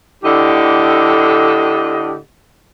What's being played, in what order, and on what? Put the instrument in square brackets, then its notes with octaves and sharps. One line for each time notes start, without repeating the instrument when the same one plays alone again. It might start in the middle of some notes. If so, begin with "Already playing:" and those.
[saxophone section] A2 D3 G4 D#5